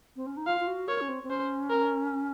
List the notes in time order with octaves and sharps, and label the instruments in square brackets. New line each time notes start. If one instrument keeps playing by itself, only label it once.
[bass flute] C4
C#4
D#4
[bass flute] F4 [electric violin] F5
[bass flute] F4
F#4
[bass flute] A#4 [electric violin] C#5
[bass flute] C#4
C4
C4
[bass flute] C#4 [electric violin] C5
[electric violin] A#4